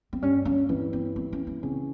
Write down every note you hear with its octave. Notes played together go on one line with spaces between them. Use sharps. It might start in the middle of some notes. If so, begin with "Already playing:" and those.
C4
G2 G3 C#4
C#4
E3 C4 E4
C4
C4
C#4
C#4
C#3 C4 C#4